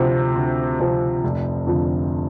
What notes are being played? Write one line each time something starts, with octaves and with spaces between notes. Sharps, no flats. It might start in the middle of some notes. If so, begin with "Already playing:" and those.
Already playing: D2 C3 F3 C4
D2
C3 F3 C4
F1
F2 D3 F3